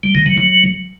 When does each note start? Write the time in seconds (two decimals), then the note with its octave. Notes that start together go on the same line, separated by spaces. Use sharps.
0.03 G3
0.15 D#3
0.26 F#3
0.38 F#3